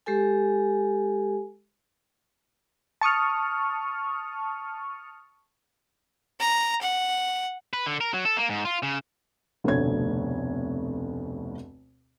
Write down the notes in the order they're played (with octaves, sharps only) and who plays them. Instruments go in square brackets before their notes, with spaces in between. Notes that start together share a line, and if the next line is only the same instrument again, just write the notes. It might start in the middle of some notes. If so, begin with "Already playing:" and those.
[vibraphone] G#3 G4 A4 G#5
[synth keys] A5 C#6 D#6 F6
[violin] A#5
F#5
[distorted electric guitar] B4
D3
A#4
F#3
A4
A#3
G#2
F4
C#3
[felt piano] F1 D2 B2 C4 C#5 G#6